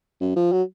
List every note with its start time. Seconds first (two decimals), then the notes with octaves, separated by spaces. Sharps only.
0.21 F#2
0.36 F3
0.52 F#3